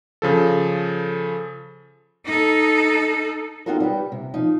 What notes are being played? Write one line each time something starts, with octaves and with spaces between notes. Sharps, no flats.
C#3 F3 A4
D#4 A4
C4 D#4 F4 F#4 A4 A#4
G3 B4 G5
C3
F3 D#4